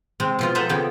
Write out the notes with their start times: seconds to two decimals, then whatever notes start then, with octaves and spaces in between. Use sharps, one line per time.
0.20 C3 G#3 C4
0.39 B2 F3 F4
0.55 A4 C5 D#5 E5 F#5 A#5
0.69 F2 C#3 B3 G5